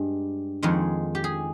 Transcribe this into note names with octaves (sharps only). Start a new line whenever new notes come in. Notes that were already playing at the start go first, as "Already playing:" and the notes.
Already playing: G2 G#3 G4
F2 D#3 G#3
G4
G#4